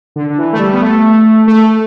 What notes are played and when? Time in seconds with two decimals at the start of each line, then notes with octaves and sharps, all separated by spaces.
0.16 D3
0.30 D3
0.38 E3
0.53 A3
0.59 G3
0.73 B3
0.82 A3
1.47 A3